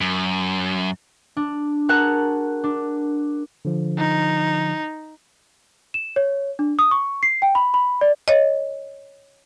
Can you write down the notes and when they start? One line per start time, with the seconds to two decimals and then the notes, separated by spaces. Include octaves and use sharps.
0.01 F#2
1.37 D4
1.89 F#4 G#4 A#4 F#5 A5 F#6
2.64 D4
3.65 D3 F3
3.98 D#4
5.94 E7
6.16 C#5
6.59 D4
6.79 D#6
6.91 C#6
7.23 C7
7.42 G5
7.55 B5
7.74 B5
8.01 D5
8.28 C#5 D#5